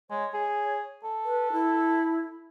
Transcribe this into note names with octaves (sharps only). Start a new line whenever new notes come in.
G#3 C#5
G#4
A4
B4
E4